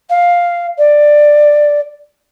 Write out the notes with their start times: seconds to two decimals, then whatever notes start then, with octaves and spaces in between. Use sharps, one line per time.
0.09 F5
0.78 D5